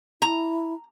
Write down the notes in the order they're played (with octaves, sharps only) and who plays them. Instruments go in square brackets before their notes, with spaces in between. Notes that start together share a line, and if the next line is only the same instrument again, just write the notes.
[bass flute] E4 [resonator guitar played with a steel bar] A#5